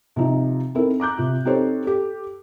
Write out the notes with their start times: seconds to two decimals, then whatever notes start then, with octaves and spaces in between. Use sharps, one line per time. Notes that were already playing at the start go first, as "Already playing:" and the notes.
0.16 C3 F3 D#4
0.75 C4 D#4 E4 A4 A#4
1.00 A#5 D6 F#6 G6
1.18 C3 F4
1.45 C4 D#4 G4 A4 C5 C#5
1.84 G4 A4